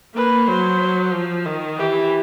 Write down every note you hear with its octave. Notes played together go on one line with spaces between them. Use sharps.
A#3 B4
F#3 C5
F3
D#3
E3 G4